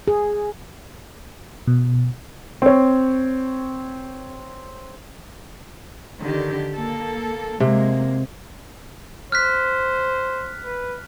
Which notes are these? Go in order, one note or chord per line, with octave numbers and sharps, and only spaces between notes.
G#4
B2
C4 C#5
D3 D#3 G4
A#3 A4
C3 G#3 A#3
C5 F6 F#6 B6
B4